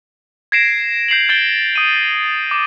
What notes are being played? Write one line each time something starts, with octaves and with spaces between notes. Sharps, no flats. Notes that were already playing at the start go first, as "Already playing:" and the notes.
G#6 A#6 C7 D7 E7
G6 C7 F7 F#7
G6 A6 D7 G7
D#6 D#7
D6